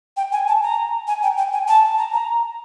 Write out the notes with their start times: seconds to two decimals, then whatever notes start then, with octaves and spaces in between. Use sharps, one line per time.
0.17 G5
0.32 G#5
0.48 A5
0.62 A#5
1.07 G#5
1.23 G5
1.38 G5
1.53 G#5
1.68 A5
1.98 A#5
2.14 A#5